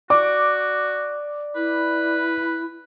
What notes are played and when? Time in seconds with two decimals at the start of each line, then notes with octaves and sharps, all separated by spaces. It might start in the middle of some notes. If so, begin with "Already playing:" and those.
0.10 F#4 D5 D6
1.56 E4 B4